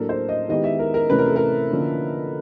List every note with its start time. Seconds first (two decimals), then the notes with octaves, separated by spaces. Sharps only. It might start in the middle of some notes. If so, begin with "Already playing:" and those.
Already playing: A2 F#3 A#3 D4 A4 A#4
0.09 C5
0.29 D#5
0.49 D#3 G#3 B3 E4 G4 D#5
0.64 E5
0.79 A#4
0.94 A#4
1.09 C3 E3 A3 C#4 B4
1.19 A#4
1.26 A4
1.36 A#4
1.70 D3 F3 A#3 C#4 E4